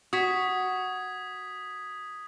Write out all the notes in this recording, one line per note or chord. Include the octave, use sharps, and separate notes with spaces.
F#4 D#6 G#6 B6